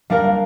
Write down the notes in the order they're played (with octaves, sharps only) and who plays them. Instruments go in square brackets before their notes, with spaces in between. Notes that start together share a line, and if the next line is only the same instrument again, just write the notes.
[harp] G3 D4 A#4 [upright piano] F5
[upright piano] F5